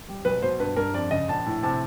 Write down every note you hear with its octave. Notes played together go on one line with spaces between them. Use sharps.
G3
B1 B4
B2 C5
G2 B4
G2 A#4
F2 D5
C#3 D#5
A#1 A5
A2
C3 A5